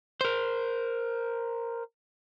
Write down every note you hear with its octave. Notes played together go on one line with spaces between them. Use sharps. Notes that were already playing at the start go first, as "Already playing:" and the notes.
A#4 C5